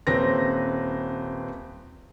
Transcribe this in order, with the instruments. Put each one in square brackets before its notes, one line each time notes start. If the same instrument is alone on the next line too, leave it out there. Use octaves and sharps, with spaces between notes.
[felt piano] D#1 C4 C#4 B4 A#6